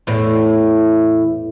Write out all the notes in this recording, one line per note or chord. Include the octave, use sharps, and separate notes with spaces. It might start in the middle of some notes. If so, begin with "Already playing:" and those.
E2 A2